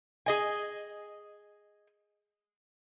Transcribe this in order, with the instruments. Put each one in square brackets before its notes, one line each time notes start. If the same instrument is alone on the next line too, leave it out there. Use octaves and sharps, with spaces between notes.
[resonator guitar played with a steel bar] G#4 D#5 G#5